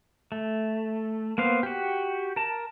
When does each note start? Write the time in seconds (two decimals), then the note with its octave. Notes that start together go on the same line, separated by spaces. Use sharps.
0.32 A3
1.38 A#3 B3 C5 F5
1.63 F#4 G4
2.36 A#4 A5